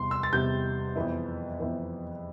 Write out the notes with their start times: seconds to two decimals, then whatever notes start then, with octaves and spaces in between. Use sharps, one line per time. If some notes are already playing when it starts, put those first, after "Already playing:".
Already playing: E2 C3 G3 C6
0.11 E6
0.23 A6
0.32 E2 C3 G3 G6
0.95 F2 E3 B3 E4
1.59 F2 E3 B3 E4